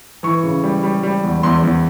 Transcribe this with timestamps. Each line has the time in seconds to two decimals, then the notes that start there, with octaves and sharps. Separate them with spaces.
0.23 E3 C#6
0.43 C#3
0.63 G3
0.83 G3
1.03 G3
1.24 E2
1.43 E2 C6
1.63 E2